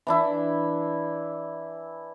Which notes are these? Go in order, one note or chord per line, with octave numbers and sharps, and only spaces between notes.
E3 D4 E4